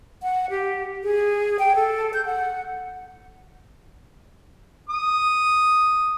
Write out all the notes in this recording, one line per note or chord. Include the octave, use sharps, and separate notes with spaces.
F#5
G4
G#4
G5
A4
G6
F#5
D#6